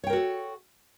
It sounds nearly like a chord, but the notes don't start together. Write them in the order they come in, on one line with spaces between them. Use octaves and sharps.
C#5 G5 A#4 F#4 A4